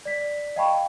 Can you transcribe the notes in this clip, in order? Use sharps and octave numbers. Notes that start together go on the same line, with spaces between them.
D5 B6
D#5 F5 G5 A5 B5 C#6